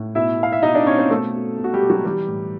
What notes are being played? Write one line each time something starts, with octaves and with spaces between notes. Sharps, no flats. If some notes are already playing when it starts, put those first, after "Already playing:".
Already playing: A2
B2 E4 E5
B2 F5
E5
B2 D#4 D#5
D4 D5
B2 C#4 C#5
C4 C5
B2 A3 A4
B2
B2
F#4
G3 G4
B2
F#3 F#4
E3 G3 G4
A2